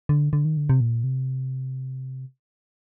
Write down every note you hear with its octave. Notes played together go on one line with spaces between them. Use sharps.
D3
D3
D#3
D3
C3
A#2
C3